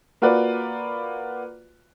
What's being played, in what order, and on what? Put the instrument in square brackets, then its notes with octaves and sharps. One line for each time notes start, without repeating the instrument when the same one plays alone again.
[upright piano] A#3 F4 F#4 B4 D5